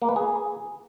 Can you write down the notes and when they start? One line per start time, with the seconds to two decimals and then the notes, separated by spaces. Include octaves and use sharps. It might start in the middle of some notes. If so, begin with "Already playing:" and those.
0.02 A#3
0.09 B4
0.16 G#4